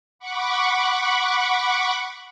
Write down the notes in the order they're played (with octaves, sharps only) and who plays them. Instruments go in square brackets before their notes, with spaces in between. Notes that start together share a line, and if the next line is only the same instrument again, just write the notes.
[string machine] F#5 B5 C#6 D6